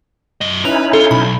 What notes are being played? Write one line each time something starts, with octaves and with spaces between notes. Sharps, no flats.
F#2 D#5
C#4 D#4 E4 B4 F7
F4 A4
B1 B5